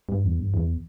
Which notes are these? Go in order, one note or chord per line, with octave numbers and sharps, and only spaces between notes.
G2
E2
G2
E2